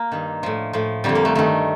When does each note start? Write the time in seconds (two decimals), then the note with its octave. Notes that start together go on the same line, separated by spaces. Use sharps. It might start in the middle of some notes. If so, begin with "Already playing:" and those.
Already playing: A#3
0.12 G2 D#3
0.43 A2 F3
0.73 A2 F3
1.04 F2 D3 F3 G3
1.15 A#3
1.25 A3
1.35 G2 D#3 A3